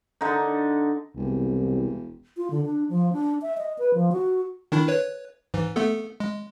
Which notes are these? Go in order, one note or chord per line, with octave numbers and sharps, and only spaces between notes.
D3 D#4
E1 C2
F4
D3
D4
F3
D4
E5
D#5
B4
F3
F#4
D#3 D4 E4
B4 C#5
G#2 E3
A3 B3 A4
G#3